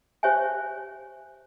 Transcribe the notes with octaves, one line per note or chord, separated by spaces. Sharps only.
G4 C5 C#5 E5 G#5